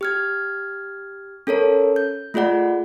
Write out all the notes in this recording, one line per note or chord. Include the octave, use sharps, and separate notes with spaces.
G4 F6 G#6
C#4 A4 A#4 C#5
G6
A3 F4 G#4 D5 F#5